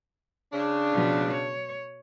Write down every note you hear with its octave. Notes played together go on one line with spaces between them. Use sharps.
C#3 D4
B2 F3
C#5